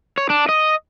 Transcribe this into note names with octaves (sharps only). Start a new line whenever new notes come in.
C#5
D4
D#5